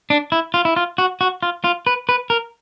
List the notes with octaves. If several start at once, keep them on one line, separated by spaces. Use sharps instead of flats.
D4
E4
F4
E4
F4
F#4
F#4
F4
F4
B4
B4
A#4